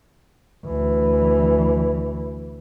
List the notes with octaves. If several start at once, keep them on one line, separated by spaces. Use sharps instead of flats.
D2 E3